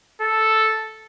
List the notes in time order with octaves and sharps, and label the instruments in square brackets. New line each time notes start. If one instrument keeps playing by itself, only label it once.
[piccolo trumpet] A4